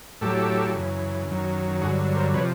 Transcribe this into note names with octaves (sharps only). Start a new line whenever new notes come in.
A2 F#3 G4 A4
F#2 C#3 E3
F#2 D#3 F#3
G2 D3 F#3 F#4 G#4
A#4 C5
C3 F3 B4 C#5